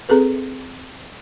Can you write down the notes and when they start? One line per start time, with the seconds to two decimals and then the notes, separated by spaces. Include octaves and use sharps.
0.09 C4 G#4 A4 B4